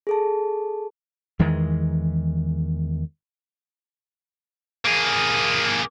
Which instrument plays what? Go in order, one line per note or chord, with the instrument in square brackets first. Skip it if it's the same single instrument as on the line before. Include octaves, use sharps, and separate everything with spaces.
[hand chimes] G#4 A4 A5
[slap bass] E2 D#3 E3 G#3
[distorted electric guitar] A#3 G#4